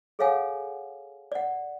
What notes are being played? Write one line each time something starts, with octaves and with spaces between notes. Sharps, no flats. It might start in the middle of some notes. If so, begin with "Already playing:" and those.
G#4 A4 C#5 F5 F#5 G#5
D5 F#5